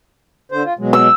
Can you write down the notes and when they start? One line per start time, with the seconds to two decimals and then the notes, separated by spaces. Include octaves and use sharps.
0.52 D3 C5
0.64 F4
0.79 B2 F#3 G#3
0.93 E6